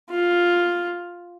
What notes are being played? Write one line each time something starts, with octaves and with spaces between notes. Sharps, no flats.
F4